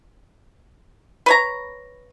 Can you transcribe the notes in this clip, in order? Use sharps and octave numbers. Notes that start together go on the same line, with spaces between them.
B4 C#5 A#5